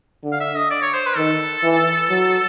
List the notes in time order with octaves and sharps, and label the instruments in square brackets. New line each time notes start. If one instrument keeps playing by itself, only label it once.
[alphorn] D3
[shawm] F5
E5
D#5
D5
C#5
C5
B4
[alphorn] D#3 [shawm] A4
[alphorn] E3
F#3